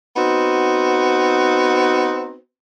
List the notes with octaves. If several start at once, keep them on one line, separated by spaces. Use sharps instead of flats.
B3 C4 D#4 F#4